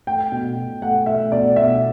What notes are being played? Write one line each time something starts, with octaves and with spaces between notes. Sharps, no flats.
A3 G5
B2
B2
A3 F#5
A3 E5
B2 D5
B2 E5